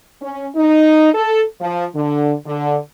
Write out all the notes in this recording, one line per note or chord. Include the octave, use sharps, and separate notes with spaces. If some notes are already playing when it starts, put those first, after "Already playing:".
C#4
D#4
A4
F3
D3
D3